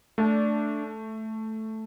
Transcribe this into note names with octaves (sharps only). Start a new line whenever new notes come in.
A3 D4